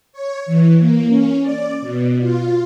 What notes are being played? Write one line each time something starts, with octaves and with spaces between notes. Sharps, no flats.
C#5
E3
A#3
C#4
D5
B2
F4